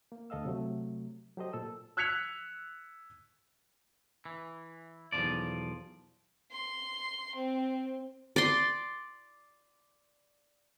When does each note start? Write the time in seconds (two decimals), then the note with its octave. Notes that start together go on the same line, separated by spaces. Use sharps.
0.12 A#3
0.30 D2 A4 D#5 F5 E6
0.45 C3 F#3 A3
1.38 F#3 G4 A4 C5 D#5
1.53 A#2 A4 E6
1.97 E6 F#6 G#6 B6 C#7 F7
4.25 E3
5.12 B1 E2 C3 F3 D5
6.52 C6
7.35 C4
8.36 D5 C6